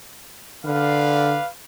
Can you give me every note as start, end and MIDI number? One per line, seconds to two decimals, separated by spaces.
0.65 1.37 50
0.65 1.48 71
0.65 1.48 74
0.65 1.48 77